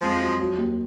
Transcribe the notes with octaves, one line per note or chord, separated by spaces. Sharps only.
F2 F3 G#3
F#3
F#3
D#2